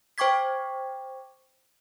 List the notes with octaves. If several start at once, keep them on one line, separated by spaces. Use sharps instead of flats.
C5 G5 C#6 D6 G#6 B6